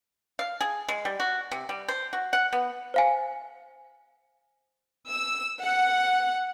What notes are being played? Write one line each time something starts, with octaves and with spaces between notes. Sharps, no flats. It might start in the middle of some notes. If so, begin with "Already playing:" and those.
F5
G#4
G#3
G3
F#4
C3
G3
C5
F#4
F#5
B3
C5 F5 G#5
E6
F#5